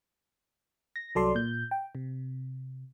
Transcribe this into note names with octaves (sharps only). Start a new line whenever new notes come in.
A#6
C2 F#3 A4 D5 C6
A#2 G6
G5
C3